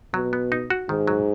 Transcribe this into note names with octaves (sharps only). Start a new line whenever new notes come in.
B2 F#3
B3
D#4
F#4
G#2 D#3
F#3